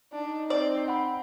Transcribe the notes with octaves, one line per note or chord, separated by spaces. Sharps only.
D4 D#4
C4 C5 D5
F#5 B5